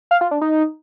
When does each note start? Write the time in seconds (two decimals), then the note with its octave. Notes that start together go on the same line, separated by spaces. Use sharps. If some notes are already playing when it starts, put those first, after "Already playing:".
0.11 F5
0.21 F4
0.31 D4
0.41 D#4